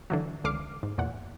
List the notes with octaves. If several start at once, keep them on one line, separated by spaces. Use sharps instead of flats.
D3 E3 F#3
C#2 D3 D6 F6 C7
G#2
E2 A#2 F#5